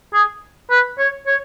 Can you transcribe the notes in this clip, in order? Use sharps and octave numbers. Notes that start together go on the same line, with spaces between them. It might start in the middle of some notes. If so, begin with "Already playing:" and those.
G#4
B4
C#5
C#5